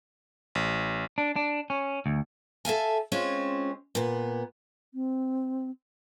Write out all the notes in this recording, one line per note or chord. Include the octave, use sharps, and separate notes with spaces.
A1
D4
D4
C#4
D2
A4 E5 F5 G#5
G#3 C4 C#4 F4
A#2 B3
C4